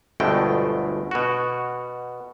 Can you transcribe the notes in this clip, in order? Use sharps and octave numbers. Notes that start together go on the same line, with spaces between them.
G1 D2 B2 G#3 A3 G5
B2 F#4